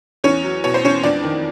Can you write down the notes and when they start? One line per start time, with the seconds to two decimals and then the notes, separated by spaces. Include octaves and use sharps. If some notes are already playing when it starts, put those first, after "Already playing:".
0.24 E2 C#4 C#5
0.44 F#3
0.64 B2 C#5
0.74 C5
0.84 E2 C#4 C#5
1.03 F2 D4 D5
1.23 D#3